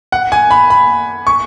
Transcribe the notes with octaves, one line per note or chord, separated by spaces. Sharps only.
F#5
G#5
B5
B5
C#6